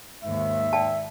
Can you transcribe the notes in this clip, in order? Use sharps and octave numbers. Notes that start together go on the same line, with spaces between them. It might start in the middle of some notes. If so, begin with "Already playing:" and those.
D#2 G#2 E5
D5 G5 A5